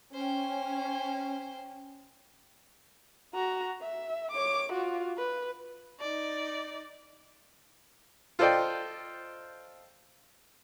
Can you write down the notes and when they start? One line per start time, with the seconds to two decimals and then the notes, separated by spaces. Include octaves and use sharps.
0.14 C#4 C5 G5
3.34 F#4 A#5
3.81 E5
4.31 C#5 D6
4.72 F4 F#4
5.18 B4
6.00 D#4 D5
8.39 F4 A4 C5 D5 D#5 G5